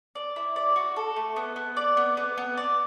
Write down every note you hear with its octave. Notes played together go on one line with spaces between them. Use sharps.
D5
E4
D5
F#4
A4
A3
B3
B3
D5
B3
B3
B3
D5